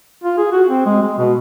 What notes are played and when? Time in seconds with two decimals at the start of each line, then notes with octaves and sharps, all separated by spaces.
0.24 F4
0.38 G#4
0.52 F#4
0.68 C4
0.86 G#3
1.03 G#3
1.18 B2